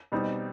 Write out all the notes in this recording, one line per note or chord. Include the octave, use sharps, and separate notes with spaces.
B2 G3 C4 D#4